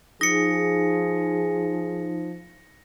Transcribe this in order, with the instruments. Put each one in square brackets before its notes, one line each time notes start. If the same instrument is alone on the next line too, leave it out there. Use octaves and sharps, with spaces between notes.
[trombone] F3 [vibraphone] D#4 [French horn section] G#4 [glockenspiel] A#6 C#7